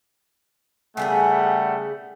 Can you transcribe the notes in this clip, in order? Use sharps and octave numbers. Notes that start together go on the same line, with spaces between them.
C#3 G3 A3 B3 G#4 F#5